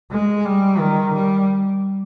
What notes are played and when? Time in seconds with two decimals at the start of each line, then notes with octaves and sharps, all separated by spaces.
0.11 G#3
0.45 G3
0.79 D#3
1.15 G3